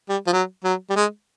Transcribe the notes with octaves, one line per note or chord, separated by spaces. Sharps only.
G3
F3
F#3
F#3
G3
G#3